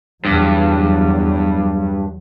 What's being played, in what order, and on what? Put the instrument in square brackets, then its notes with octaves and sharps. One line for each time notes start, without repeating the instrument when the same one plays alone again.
[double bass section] E2 F#3 [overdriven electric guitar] G2